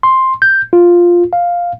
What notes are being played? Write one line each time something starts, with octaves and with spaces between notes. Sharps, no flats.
C6
G6
F4
F5